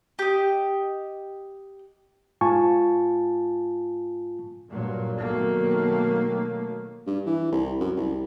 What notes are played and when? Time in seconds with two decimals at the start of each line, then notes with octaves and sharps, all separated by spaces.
0.19 G4 D#5
2.41 G#2 F4 G#5 A5 C#6
4.70 G2 A#2 F#3
5.18 B2 D#3 F#3 A3 A#3
7.07 G2
7.26 E3
7.52 C2
7.81 F#2
7.97 C2